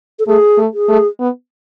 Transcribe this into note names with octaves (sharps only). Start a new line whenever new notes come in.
A4
A3 G#4
A3
G#4
A3
B3